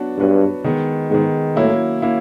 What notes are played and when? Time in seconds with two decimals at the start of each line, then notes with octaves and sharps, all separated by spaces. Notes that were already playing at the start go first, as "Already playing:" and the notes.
Already playing: F#3 B3 D4 F#4 B4
0.18 G2 F#3 B3 D4 F#4 B4
0.64 D#3 G#3 B3
1.10 G#2 D#3 G#3 B3
1.56 A2 F#3 A#3 C#4 E4
2.02 F#3 A#3 C#4 E4